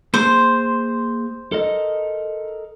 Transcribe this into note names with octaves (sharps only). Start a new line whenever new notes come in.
A#3 G#4 C5 C6
A4 A#4 D#5